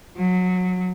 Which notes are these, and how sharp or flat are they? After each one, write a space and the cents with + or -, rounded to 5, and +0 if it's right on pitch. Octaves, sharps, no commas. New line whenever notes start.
F#3 -20